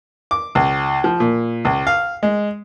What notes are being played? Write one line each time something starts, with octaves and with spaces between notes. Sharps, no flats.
D6
C#2
F3
A#2
C#2
F5
G#3